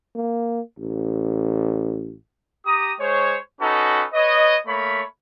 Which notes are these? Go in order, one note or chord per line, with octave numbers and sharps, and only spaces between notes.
A#3
A1
G4 A#5 D#6
G#3 C5 C#5
C#4 D#4 F#4 A4 B4
B4 C#5 D#5
A3 A#3 C#5 B5